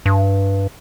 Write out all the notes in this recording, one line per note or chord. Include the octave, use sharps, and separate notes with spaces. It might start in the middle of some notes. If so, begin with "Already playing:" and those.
G2